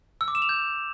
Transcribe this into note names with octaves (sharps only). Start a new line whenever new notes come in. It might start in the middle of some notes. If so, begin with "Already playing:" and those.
E6
D6
E7
F7
G6